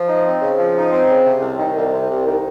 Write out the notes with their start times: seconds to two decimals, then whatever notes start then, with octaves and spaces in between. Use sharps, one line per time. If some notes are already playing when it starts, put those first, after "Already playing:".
Already playing: F3
0.08 D#4
0.24 C4
0.41 C#3
0.58 F3
0.75 D#4
0.91 C4
1.08 C#3
1.25 C3
1.42 C2
1.59 D#3
1.76 C2
1.92 C3
2.09 C2
2.26 D#3